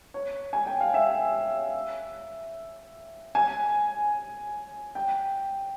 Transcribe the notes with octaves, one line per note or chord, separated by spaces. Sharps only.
C#5
G#5
G5
F5
E5
G#5
G5